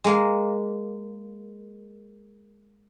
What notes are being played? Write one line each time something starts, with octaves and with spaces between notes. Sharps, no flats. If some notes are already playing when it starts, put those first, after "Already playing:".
G#3 A#3